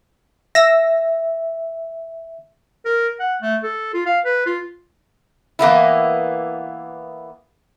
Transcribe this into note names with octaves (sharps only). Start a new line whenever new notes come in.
E5 E6 A#6
A#4
F#5
A3
A4
F4
F5
B4
F4
E3 A#3 B3 E4